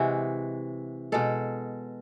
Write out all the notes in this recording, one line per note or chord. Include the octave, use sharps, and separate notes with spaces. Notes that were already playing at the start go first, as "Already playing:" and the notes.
Already playing: C3 E3 G#3 F#4
B2 G#3 A4